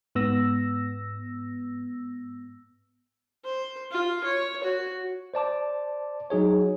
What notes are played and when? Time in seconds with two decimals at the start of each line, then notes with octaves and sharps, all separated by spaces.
0.15 G#2 B3 E6 A#6
3.45 C5
3.91 F4
4.24 C#5
4.64 F#4
5.34 C5 D5 A5 D6
6.30 F#3 D#4 G#4 C#5